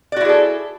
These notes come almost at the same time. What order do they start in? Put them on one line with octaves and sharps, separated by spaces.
D5 F#4 E4 G#4 A4